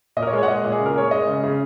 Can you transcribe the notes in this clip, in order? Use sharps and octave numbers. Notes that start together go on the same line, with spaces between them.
A#2 D#5
A#4
C#5
G#3
C#5
F#5
G#3 D#5
A#2
G#4
C#3
A#4
G#3 C#5
G#3 D#5
C#3
C#3